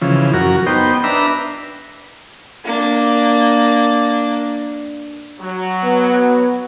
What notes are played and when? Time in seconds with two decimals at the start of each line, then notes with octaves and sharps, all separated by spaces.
0.02 C#3 E3 F3
0.34 F#2 F#4 A#4
0.66 B3 D#4 C5 G5
1.04 D4 B4 E5 A#5
2.65 A#3 D4
5.41 F#3
5.84 B3